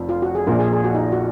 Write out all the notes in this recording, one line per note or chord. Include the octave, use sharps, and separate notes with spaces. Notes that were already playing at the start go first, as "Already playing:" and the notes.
Already playing: F1 F2 F3
F4
F#4
G#4
A#1 A#2 F3 A#4
G#4
G#4
F#4
D#4
F#4